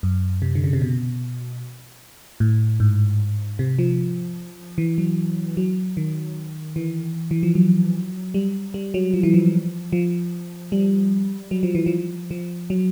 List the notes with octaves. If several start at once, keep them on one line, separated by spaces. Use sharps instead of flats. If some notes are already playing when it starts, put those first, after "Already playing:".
F#2
C3
D3
C#3
C3
B2
A2
G#2
C3
F3
E3
F#3
F#3
D#3
E3
E3
F3
F#3
G3
G3
F#3
F3
E3
F3
F3
G3
F#3
F3
E3
F3
F3
F#3